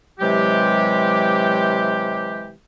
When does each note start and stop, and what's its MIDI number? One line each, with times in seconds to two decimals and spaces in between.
0.20 2.53 48
0.20 2.53 52
0.20 2.53 54
0.20 2.53 56
0.20 2.53 67